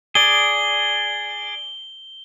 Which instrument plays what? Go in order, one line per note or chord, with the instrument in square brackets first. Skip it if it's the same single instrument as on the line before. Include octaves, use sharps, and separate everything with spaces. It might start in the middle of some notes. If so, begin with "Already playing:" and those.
[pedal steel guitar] G#4 D5 [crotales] G7